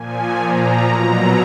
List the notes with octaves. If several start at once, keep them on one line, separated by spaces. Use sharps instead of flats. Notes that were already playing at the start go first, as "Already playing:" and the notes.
Already playing: A#2 F3 G#5
A#2 F3 A#5
B2 F#3 A#5